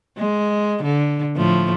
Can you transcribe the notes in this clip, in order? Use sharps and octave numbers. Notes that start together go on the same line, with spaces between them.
G#3
D3
A2 F3 A3